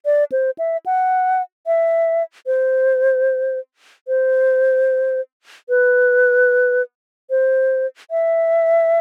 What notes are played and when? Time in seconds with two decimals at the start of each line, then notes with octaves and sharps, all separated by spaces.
0.05 D5
0.32 C5
0.58 E5
0.86 F#5
1.67 E5
2.46 C5
4.08 C5
5.69 B4
7.30 C5
8.11 E5